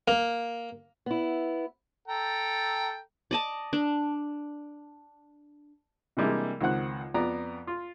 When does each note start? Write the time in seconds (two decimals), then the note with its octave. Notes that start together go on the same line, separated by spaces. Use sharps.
0.08 A#3
1.06 B3 E4
2.08 A4 G5 A#5
3.31 D5 D#5 A5
3.73 D4
6.17 C3 E3 G3 G#3 A#3 D4
6.61 C#2 D#3 C4 F#5 F#6
7.14 F2 B3 D5 A#5
7.67 F4